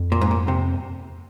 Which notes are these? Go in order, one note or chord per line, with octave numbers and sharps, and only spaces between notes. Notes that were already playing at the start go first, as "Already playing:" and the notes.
Already playing: F2
A#2
G#2
A#2
C3